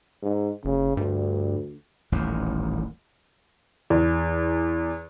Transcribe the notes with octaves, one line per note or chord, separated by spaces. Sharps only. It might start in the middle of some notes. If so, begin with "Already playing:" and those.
G#2
F#1 C#3
D2 G2
D#1 A1 D#2
E2